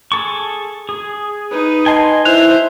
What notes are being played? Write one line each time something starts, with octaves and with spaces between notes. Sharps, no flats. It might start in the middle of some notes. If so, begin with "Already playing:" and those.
G#4 A4 C#6
G#4
D#4 B4
D#5 G#5 A5 C6
E4 C5 E5 F#6 F7